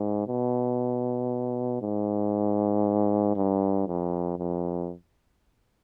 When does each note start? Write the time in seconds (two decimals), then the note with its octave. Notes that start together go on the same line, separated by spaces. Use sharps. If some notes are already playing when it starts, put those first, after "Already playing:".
Already playing: G#2
0.28 B2
1.82 G#2
3.36 G2
3.87 F2
4.38 F2